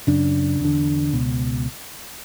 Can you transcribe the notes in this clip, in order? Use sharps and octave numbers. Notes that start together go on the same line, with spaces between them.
F#2 C#3 D4
E2 D3
C#2 B2